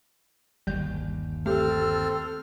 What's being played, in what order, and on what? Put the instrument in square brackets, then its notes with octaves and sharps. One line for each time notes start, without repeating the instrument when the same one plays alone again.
[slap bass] G1 D#2 [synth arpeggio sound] G3 G6
[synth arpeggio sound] A3 G4 [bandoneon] C4 F6 [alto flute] A4